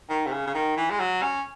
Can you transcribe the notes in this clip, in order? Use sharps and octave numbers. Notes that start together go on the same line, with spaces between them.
D#3
C3
C#3
C#3
D#3
E3
G#3
F#3
C#4